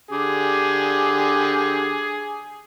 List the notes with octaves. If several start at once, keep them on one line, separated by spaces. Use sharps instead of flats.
D3 G4 G#4